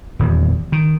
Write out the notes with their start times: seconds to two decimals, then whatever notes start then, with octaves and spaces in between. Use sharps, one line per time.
0.19 D#1 E2
0.72 D#3